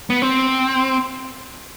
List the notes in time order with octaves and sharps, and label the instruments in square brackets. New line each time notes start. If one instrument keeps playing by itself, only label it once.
[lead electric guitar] B3
C4